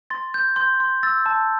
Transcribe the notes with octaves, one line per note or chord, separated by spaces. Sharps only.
C6 A6
G6
C6 G6
C6
E6 A6
A5